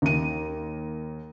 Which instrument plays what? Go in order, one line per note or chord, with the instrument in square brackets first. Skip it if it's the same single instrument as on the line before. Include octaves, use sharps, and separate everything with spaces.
[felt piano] D#2 D#7